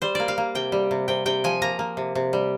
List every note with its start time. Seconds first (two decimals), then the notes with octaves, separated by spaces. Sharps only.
0.02 G3 C5
0.15 A#3 D5
0.28 F5
0.38 A#3
0.55 C3 G5
0.72 G3
0.91 C3
1.08 C3 G5
1.26 C3 G5
1.44 F3 G#5
1.62 A#3 A#5
1.79 A#3
1.97 C3
2.15 C3
2.33 G3